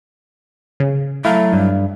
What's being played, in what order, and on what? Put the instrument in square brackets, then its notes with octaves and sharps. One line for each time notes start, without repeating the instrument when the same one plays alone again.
[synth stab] C#3
[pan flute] F#3 [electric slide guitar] A3 [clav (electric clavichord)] E4 F5 A#5
[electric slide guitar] G2